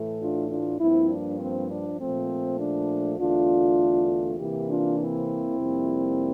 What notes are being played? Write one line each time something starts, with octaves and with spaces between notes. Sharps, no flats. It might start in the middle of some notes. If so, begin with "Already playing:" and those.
Already playing: A2 E3 A3
D4 F4
D4 F4
G2 F3 A#3 C4 E4
D4
C4
D4
A#2 F3 A3 C4
D4
E2 D3 A3 D4 F4
C3 E3 A#3 E4 G4
D4 F4
C4 E4
F2 C3 G3 A#3